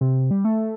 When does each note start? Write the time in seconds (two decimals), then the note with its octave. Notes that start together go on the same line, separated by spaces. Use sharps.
0.01 C3
0.31 G3
0.45 A3